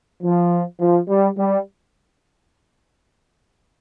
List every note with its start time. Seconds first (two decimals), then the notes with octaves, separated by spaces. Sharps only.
0.22 F3
0.79 F3
1.08 G3
1.37 G3